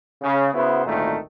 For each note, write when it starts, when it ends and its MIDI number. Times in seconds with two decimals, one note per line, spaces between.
0.22 0.50 49
0.54 0.84 49
0.54 0.84 59
0.54 0.84 64
0.54 0.84 66
0.54 0.84 71
0.54 0.84 72
0.85 1.18 32
0.85 1.18 38
0.85 1.18 46
0.85 1.18 51
0.85 1.18 57